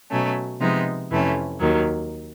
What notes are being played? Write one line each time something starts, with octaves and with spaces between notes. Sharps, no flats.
B2 F#3 A3 C#4
C3 F3 G#3 B3 D#4
F2 C3 E3 A3 C#4
D#2 D#3 F#3